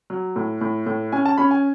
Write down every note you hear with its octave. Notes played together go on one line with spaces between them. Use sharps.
F#3
A2
A2
A2
C#4 G#5
A5
C#4 B5
G#5